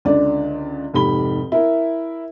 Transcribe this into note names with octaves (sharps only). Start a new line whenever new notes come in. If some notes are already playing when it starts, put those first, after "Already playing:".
C#2 D3 D5
F1 G#2 G4 B5 G7
E4 A#4